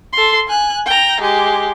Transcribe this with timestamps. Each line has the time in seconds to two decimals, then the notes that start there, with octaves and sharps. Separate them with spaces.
0.13 A4 C6
0.47 G#5 F#6
0.86 G5 A#5
1.21 G#3 G4